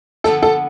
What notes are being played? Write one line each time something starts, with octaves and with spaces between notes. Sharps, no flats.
D3 F3 B3 E4 A4
A4